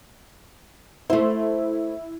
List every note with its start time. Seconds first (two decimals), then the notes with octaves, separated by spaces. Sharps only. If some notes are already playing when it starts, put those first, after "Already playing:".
1.10 A3 E4 C5